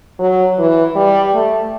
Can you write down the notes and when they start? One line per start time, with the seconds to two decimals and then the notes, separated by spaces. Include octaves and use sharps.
0.19 F#3
0.58 E3
0.96 G3
1.34 A3